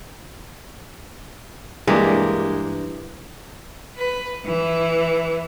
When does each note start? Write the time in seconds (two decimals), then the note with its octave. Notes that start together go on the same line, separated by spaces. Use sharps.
1.87 G2 E3 G#3 A#3 D4 G4
3.97 B4
4.46 E3